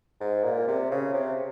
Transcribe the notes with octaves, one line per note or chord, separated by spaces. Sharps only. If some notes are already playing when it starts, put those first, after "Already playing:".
G#2
A#2
C3
C#3
C3